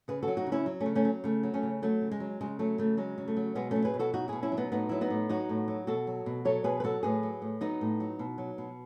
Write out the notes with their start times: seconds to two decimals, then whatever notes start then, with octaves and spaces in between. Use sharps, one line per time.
0.08 C#3 G#4 B4
0.23 F#4 A4
0.28 F#3
0.37 D#4 F#4
0.47 C#3
0.52 C#4 E4
0.66 F#3
0.80 A3 C#4
0.86 C#3
0.95 A3 C#4
1.05 F#3
1.24 C#3 A3
1.43 F#3
1.54 A3 C#4
1.63 C#3
1.82 F#3 A3
2.01 C#3
2.11 G#3
2.20 F#3
2.41 C#3 G#3
2.59 F#3 A3
2.78 C#3 A3
2.97 F#3 G#3
3.18 C#3
3.28 A3
3.36 F#3
3.55 B2 G#3 B3
3.71 F#3 A3 C#4
3.85 G#4 B4
3.94 B2
3.99 F#4 A4
4.13 F#3 D#4 F#4
4.28 B2 E4 G#4
4.42 C#4 E4
4.52 F#3
4.57 B3 D#4
4.72 A2 B3 D#4
4.89 F#3 E4
5.01 B3 D#4
5.10 A2
5.29 F#3 D#4 F#4
5.49 A2
5.68 F#3
5.87 B2 F#4 A4
6.07 F#3
6.26 B2
6.45 F#3 A4 C#5
6.64 B2 G#4 B4
6.80 B4
6.84 F#3 F#4 A4
7.03 A2 G#4 B4
7.23 F#3
7.42 A2
7.61 F#3 B3 D#4
7.81 A2
8.00 F#3
8.19 B2
8.38 F#3
8.58 B2